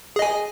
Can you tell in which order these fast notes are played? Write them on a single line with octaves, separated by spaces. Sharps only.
G#4 D#5 G#5